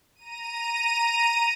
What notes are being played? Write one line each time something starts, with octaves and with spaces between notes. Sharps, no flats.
A#5 D#7